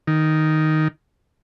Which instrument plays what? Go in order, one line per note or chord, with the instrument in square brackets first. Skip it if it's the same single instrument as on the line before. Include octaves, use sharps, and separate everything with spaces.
[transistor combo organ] D#3